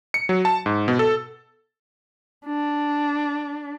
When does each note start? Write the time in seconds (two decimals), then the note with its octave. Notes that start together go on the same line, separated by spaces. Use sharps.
0.14 C#7
0.29 F#3
0.45 A5
0.66 G#2
0.88 B2
0.99 A4
2.46 D4